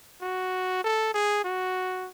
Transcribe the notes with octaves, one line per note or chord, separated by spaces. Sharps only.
F#4
A4
G#4
F#4